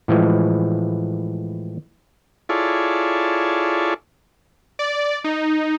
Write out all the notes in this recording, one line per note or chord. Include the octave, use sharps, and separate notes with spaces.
A2 E3 F3 G#3
E4 F4 G#4 A4 C#5 D5
D5
D#4